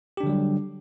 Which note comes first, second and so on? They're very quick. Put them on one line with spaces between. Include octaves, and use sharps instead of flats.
G4 D4 D3 F#3 G3